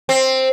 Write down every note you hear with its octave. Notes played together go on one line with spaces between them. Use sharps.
C4